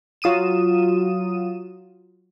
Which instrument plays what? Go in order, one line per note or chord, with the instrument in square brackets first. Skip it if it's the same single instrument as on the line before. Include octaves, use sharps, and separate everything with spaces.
[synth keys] F#3 F4 D#6 D#7 E7